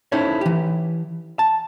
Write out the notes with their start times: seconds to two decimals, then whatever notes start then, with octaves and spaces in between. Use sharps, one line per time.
0.12 C#4 D#4 E4 A4 C5 C#5
0.41 E3 G4
1.39 A5